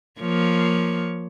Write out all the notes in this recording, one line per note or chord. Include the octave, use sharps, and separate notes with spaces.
F3 A#3 C#5